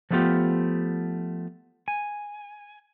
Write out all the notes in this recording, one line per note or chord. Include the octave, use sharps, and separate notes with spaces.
F3 F#3 A3 B3 F4 G4
G#5